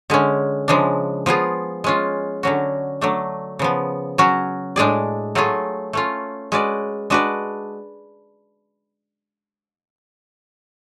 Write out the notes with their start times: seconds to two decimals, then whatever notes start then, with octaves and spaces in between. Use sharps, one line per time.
0.10 D3 G#3 C#4
0.68 C#3 F3 G#3 D4
1.26 F3 B3 F4 G#4
1.84 G#3 C#4 F4
2.43 D3 F#3 C#4 F#4
3.01 F#3 A3 D4
3.59 C#3 F3 B3
4.18 F#3 C#4 F#4
4.76 A2 G#3 D4 G#4 D5
5.35 F#3 A3 F4 G#4
5.93 A3 C#4 F4
6.52 G#3 C#4 F#4 B4 D5
7.10 G#3 D4 F#4 B4 D5